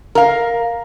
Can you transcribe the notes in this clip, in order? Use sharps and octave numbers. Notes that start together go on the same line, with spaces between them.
A#4 F5